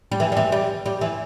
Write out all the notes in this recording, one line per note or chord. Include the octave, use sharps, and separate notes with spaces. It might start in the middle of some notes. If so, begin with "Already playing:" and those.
G3
E3
G3
E3
G3
G3
E3